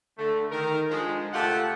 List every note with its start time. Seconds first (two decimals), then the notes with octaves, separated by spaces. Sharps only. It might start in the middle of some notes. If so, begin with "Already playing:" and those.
0.18 D3 A3
0.51 D#3 A#4
0.90 D3 F3 G#3
1.33 C3 A3 F4 G4 F#5 A5